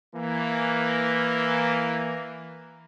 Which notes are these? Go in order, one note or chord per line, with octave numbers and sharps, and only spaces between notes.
E3 A#3